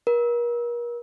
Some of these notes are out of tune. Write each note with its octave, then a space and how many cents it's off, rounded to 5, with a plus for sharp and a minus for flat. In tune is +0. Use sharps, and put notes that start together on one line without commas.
A#4 +40